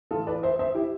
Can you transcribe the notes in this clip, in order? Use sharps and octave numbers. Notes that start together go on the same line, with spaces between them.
A2 E3 F4 A4
B4 D5
C5 E5
C5 E5
E4 G4